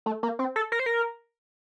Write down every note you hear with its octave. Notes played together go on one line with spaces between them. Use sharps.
A3
A#3
C4
A4
A#4
C5
A#4